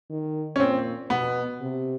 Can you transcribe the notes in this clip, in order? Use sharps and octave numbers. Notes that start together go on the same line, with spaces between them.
D#3
C#4
A#2 C4
B2 B3
C3